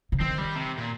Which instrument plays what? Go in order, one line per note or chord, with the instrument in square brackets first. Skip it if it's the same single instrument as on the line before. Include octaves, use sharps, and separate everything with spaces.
[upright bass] C3
[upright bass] D#3 [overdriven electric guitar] C4
[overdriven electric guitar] G3
C3
A#2